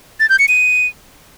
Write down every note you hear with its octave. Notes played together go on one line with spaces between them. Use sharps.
A6
G6
C#7
D#7